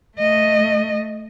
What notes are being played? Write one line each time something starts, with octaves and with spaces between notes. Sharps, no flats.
A3 D#5